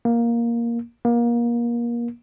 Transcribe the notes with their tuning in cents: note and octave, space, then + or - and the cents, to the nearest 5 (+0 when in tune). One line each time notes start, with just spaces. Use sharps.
A#3 +10
A#3 +30